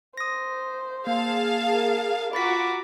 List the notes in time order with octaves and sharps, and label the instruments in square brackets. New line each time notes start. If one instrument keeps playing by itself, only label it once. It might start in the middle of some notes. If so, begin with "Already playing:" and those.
[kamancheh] C5 [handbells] D#6 A#6
[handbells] A#3 [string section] G#4 F5 A5
[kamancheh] A#4
[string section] F4 F#4 A#5 [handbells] B5 A6 B6 [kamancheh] D6